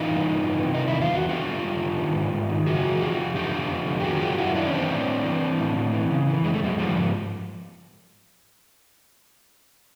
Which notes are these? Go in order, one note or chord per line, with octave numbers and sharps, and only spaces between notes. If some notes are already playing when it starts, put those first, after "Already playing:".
Already playing: E3 D#4 F4
G2
G2
E3
C3
D#3 D#4
E4
E2
F4
E2 F#4
D3 F4 G4
G2
G2
D3
D#3
G#2
G#2
D#3
C#3 F#4 G#4
E3
F2 F4 G4
F2
D3 F4 G4
F2
F2
D3
G4
D#3 F#4 G#4
F#2 F4 G4
F#2 E4 F#4
D#3 D4 E4
C#4
E3 C4 D4
A2
A2
E3
E3
A2
A2
E3
C#3
E3
F2 G#3
A3
F2 F#3 G#3
D#3 F3 G3
G#2 F3